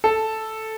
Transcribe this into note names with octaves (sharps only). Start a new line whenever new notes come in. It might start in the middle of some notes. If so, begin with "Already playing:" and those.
A4